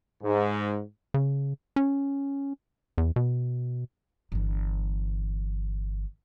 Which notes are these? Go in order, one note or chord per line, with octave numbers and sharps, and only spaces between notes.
G#2
C#3
C#4
E2
B2
G1 E3